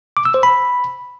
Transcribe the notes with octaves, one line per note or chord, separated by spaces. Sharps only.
D6
E6
C5
B5